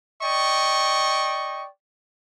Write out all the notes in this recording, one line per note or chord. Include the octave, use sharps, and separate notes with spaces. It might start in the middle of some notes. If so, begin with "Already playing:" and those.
D5 D#5 G5 C#6